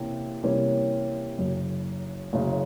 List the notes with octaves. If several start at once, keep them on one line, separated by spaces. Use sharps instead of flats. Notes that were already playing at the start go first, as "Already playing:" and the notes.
Already playing: C3 E3 A#3 C#4
C3 E3 G3 A#3 C#4
F#1 F#2 C#3
F#1 F#2 C#3